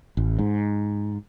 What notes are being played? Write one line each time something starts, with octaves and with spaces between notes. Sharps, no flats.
A1
G#2